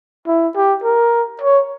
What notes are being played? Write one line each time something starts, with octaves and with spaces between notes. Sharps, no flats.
E4
G4
A#4
C#5